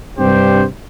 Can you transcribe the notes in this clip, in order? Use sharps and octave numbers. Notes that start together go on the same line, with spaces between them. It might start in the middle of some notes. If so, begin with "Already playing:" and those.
G2 C3 C4 D4 G4 C5